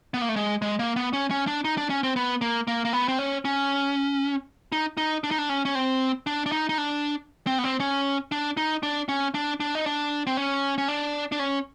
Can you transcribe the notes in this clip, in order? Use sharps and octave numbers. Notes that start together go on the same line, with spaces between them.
B3
A#3
A3
G#3
G#3
A#3
B3
C#4
C#4
D4
D#4
D4
C#4
C4
B3
A#3
A#3
A#3
B3
C4
C#4
C#4
D#4
D#4
D4
D#4
D4
C#4
C#4
C4
D4
D4
D#4
D#4
D4
C4
B3
C4
C#4
D4
D#4
D4
C#4
D4
D4
D#4
D4
C4
C#4
C#4
D4
D4
C#4